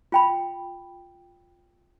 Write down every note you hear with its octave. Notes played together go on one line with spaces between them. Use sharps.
F4 G5 B5